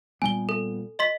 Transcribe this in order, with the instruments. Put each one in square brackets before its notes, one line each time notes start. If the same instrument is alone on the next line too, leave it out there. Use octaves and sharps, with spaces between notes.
[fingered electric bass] A#2 G3 B3 [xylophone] G#5 G7
[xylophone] A4
D#5 C6 B6